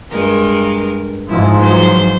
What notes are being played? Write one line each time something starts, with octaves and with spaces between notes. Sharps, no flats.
G2 G#3 A#4
G#2 F3 E4
E3 F#3 C5